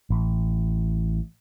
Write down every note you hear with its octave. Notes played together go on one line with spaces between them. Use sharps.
A1